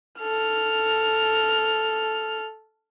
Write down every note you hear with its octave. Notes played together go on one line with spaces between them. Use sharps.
A4 F6